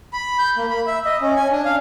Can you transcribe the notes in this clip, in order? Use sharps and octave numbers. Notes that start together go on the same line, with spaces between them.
B5
G6
A#3
B5
E5
D#5
C#4
G#5
D4
F5